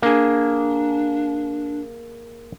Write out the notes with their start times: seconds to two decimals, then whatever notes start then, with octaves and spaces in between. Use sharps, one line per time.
0.02 A#3 D4 G#4